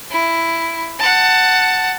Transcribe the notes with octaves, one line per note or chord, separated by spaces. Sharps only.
E4
F#5 A5